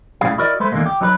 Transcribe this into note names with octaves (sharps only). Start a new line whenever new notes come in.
C#2 A2 C#3 G3 G#4 F5
E4 F#4 A#4 D5 D#5
G#3 A3 B4 C5
E2 D3 D#3 F#3 G#3 A#3
G4
F#3 D#4 A#4 B4